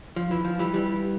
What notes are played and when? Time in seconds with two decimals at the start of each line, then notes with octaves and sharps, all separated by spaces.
0.16 F3
0.31 E3
0.45 F3
0.59 E3 G3
0.74 E3 G3